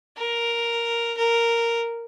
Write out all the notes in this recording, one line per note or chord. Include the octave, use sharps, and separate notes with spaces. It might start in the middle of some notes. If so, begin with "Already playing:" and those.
A#4
A#4